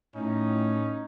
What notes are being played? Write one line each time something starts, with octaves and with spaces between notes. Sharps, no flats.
A2 C#4 D#4